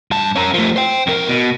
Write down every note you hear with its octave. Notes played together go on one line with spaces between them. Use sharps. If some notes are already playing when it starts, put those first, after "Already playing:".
G2 A5
C#4 A#4
F3 A3
C5 G5
F2 A#4
B2